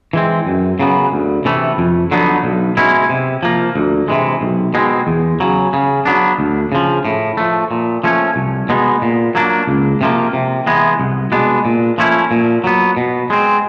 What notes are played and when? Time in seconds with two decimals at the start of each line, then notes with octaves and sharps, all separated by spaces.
0.13 E3 G#3 C4
0.47 F#2
0.79 C#3 F#3 B3
1.12 D2
1.45 C3 E3 A3
1.78 F2
2.11 D3 F#3 B3 D#4
2.44 B1
2.77 B2 G#3 C#4 E4
3.09 C3
3.43 F3 A#3
3.76 D2
4.08 C3 E3 G#3
4.41 B1
4.74 B2 G#3 C4
5.07 E2
5.40 C#3 F#3
5.73 C#3
6.05 F#3 B3 D4
6.39 D2
6.72 C#3 F3
7.05 A2
7.37 F3 A3
7.71 A#2
8.04 F3 A3 C#4
8.36 C2
8.69 B2 G#3 B3 D#4
9.02 A#2
9.35 F#3 A#3 D4
9.67 C#2
10.01 C3 F3 A#3
10.33 C3
10.66 E3 G#3 B3
11.00 C2
11.32 B2 G#3 B3 D4
11.65 A#2
11.98 F3 A3 C#4 E4
12.31 A#2
12.64 F#3 B3
12.97 B2
13.30 G#3 C4